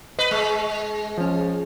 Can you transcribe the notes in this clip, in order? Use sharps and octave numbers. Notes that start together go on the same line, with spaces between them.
B4 D#5
G#3
F3 C#4